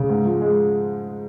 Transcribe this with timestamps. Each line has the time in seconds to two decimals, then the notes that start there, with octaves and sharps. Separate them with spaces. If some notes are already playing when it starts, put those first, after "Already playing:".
Already playing: C#3
0.09 G#2
0.25 F3
0.41 G#3